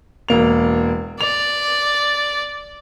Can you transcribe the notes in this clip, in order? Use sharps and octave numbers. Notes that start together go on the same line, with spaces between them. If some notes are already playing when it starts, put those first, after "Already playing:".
E1 A#3 F7
D5 F7